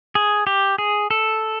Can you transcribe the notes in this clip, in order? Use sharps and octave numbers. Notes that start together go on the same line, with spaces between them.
G#4
G4
G#4
A4